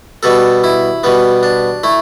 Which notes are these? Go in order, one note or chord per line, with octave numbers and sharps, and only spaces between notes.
B2 G3 B3 A4
E4
B2 G3 B3
D4
A3 E4